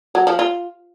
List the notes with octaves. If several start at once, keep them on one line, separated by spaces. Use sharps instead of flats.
F#3
F3
F4